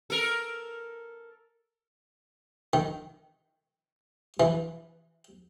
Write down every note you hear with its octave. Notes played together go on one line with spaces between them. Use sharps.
A4 A#4
D#3
E3